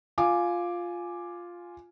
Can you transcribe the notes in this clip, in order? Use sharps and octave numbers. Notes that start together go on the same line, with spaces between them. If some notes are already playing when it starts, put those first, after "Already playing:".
F4 G#5 D6